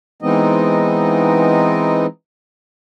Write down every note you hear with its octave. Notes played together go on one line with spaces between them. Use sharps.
E3 G#3 B3 C4 D#4 D#5